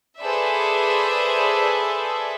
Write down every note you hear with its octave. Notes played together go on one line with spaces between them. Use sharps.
G#4 A4 B4 C5 D5 E5